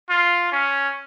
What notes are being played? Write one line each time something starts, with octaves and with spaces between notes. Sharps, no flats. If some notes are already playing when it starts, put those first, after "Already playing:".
F4
C#4